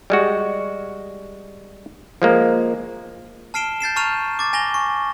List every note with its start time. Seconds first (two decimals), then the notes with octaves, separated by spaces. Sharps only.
0.10 G3 G#3 F#4
2.22 F3 G#3 A#3
3.54 A5 F6 C7 D7 E7 G7
3.80 G6 A6 C7 E7
3.96 A5 A#5 C#6 F6 D#7 F7
4.39 D6 A6
4.53 G#5 A#6 F7 G7
4.74 C#6